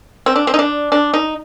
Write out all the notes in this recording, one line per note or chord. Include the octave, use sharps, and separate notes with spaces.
C4
D4
C4
D#4
D4
D4
D#4